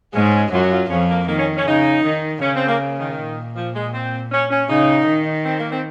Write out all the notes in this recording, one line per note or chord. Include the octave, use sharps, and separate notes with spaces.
G#2 G#3 C#4
F#2 F#3 F4
F#4
F4
F2 F3 C#4
A#3
D#3 A#3
C#4
C#4
C#3 D#4
D#3
C#3 C#4
C4
A#3
D#3
A#2
F3
G#3
C4
C#4
C#4
C#3 D#4
D#3
C4
A#3
C4